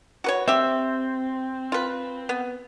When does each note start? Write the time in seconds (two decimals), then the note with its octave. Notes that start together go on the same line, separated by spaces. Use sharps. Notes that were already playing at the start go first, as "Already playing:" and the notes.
0.24 F#4 B4 C#5
0.48 C4 G4 E5
1.72 F4 B4
2.29 B3